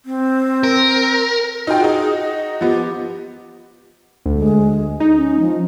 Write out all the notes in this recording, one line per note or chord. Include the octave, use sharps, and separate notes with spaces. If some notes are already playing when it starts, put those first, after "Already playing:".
C4
A#4
D#4 F4 F#4 G5
D#4 F#4 G#4
D#5
F3 B3 G4
D2
G#3
D#4
C#4
F3